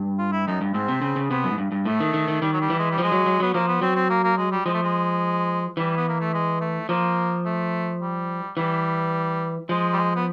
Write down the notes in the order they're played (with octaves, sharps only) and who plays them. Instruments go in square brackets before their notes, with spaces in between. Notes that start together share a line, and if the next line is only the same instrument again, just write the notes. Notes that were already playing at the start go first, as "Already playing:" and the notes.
Already playing: [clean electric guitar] G2
[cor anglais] F4
E4
[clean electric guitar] F#2 [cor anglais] D#4
[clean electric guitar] G2
[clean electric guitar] G#2 [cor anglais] C4
[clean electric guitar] C3
C#3
C#3
[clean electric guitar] C3 [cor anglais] B3
[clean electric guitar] F#2
G#2
G2
G2
[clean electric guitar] A2 [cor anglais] A3
[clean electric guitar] D#3
D#3
D#3
[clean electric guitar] D#3 [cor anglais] G3
[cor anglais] F#3
G3
[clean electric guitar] E3
[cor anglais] G#3
G3
[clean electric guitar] F3
[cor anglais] G#3
[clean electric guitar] F#3
F#3
[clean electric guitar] F#3 [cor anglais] B3
[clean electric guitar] F3 [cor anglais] A#3
[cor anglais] B3
[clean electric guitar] F#3 [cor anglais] C4
[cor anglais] C4
A#3
A#3
G#3
G3
[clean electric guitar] F3 [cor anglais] G#3
[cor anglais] A3
G#3
[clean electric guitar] E3 [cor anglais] G3
[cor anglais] B3
A#3
A3
G#3
A3
[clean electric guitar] F3 [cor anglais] A#3
[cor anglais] A3
G3
[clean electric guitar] E3 [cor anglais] G3
[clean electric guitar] F3 [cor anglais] G#3
[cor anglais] G3
G#3
B3